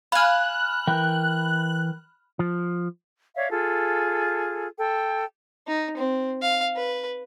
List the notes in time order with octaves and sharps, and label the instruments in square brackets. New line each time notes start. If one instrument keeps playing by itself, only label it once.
[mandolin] F5 G#5 [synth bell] B5 F6 [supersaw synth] F#6
[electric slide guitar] E3 A#4 G5
[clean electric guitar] F3
[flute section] C#5 D5 E5 F5
F4 G#4 A4
A4 G5
[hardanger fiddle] D#4
C4
F5
B4